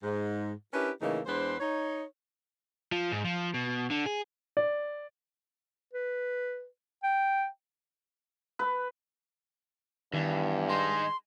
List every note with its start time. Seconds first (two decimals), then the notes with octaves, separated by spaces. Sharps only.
0.03 G#2
0.72 C#4 D4 E4 G4 A#4 B4
1.00 A2 C#3 E3 A#3 D#4
1.26 E2 G#3 D4 B4 C5
1.59 D#4 C#5
2.92 F3
3.12 G#2
3.24 F3
3.54 B2
3.90 D3
4.05 G#4
4.57 D5
5.93 B4
7.03 G5
8.59 B4
10.14 E2 G2 D#3
10.69 G#3 D#4 C6